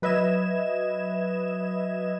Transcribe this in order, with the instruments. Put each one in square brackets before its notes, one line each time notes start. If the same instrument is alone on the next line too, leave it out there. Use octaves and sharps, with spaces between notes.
[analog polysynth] F#3 B4 D#5 E5 G#6 E7